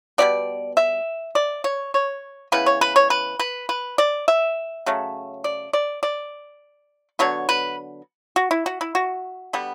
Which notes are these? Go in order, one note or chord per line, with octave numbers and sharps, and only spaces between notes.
B2 G3 B3 D5
E5
D5
C#5
C#5
C#3 E3 B3 B4
C#5
B4
C#5
B4
B4
B4
D5
E5
C#3 F#3 A3
D5
D5
D5
D3 F#3 B3 C#5
B4
F#4
E4
F#4
E4
F#4
D3 G3 B3